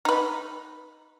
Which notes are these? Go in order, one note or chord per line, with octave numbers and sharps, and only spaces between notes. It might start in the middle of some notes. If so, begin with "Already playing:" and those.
D#4 B4